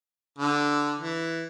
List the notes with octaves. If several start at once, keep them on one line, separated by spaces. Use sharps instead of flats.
D3
E3